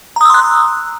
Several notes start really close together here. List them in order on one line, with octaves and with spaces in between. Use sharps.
A#5 D#6 E6 C6 F#6